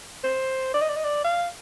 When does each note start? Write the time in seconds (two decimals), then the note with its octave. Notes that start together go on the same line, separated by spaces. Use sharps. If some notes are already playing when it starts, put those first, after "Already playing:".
0.24 C5
0.74 D5
0.81 D#5
0.89 D5
0.96 D#5
1.04 D5
1.24 F5